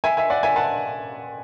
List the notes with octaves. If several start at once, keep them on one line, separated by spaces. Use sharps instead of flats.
E5 G#5
E5 G#5
D5 F#5
E5 G#5
F#5 A5